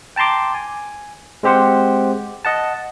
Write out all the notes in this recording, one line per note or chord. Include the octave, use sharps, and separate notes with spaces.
G5 A5 A#5 C6 D6
G#5
G#3 C4 G4 C5 F#5
D#5 F#5 A5